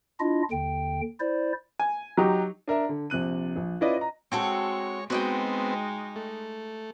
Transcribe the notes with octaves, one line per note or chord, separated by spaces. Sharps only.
D4 E4 F4 D#5
D#2 D3 G5
E4 C5 D5
G#5
F#3 D#4 G4
D4 A#4 E5
D3
A#1 C3 F#6 D#7
A#1
C#4 E4 F4 B4 D5 D#5
D#5 A#5
G#3 C4 F#4 A4 C#5
G#3 B3 C4 D#4 F#4 D#5 G5
A3